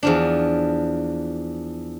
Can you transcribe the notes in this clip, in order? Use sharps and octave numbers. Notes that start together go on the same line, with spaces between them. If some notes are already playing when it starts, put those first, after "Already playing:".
E2 F3 D4